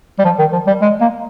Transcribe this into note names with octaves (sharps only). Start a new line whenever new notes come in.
G3
F3
D#3
F3
G3
G#3
A#3